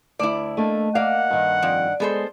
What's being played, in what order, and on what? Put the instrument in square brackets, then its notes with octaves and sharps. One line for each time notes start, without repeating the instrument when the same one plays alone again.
[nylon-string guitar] D2 [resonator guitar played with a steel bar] E4 D5
[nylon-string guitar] A3 A#3 D4 [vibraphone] D#5
[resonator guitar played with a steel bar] A#3 F5 [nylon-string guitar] D5 [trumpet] F#5
[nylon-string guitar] G2 D#3
[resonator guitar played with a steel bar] F2 [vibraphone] D5
[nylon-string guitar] G#3 [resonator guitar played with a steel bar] B3 A4 C5